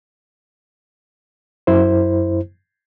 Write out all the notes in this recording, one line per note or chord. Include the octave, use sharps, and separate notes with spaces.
F#2 E4 C5